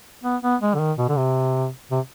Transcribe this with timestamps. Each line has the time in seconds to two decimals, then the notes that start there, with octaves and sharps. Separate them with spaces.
0.24 B3
0.43 B3
0.61 G#3
0.74 D3
0.79 D#3
0.98 B2
1.09 D3
1.17 C3
1.91 C3